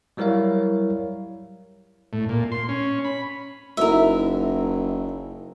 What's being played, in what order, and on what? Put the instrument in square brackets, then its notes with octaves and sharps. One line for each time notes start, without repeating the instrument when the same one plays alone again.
[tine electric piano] F#3 G3 E4 A#4 C#5 F5
[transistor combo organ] A2
A#2
C6
C#4
B5
[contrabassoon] F#1 [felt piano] D#4 E4 F#4 [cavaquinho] A#4 E5